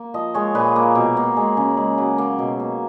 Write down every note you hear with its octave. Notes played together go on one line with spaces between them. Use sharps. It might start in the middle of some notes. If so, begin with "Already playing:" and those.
Already playing: A#3
F3 D#5
G#3 C#5
A#2 B4
A#3
B2
A#3
G#3
C#3
G#3
F#3
A#3
B2
A#3